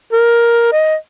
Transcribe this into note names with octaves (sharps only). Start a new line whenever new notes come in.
A#4
D#5